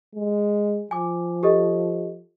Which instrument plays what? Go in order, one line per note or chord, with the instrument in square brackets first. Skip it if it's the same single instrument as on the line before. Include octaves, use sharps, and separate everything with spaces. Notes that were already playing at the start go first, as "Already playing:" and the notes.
[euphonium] G#3
[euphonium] F3 [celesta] G#5 D6
[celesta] G4 A4 D#5